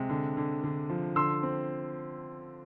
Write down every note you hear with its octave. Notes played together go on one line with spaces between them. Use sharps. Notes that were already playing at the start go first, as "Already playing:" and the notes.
Already playing: C3 G#3
D3
D3
D3
F3
D3 C6 E6
C4